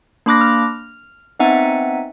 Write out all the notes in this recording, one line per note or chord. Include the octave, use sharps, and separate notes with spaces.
A#3 D4 B5 D6 F#6 A#6
F6
B3 C4 D#4 E5 F#5 G#5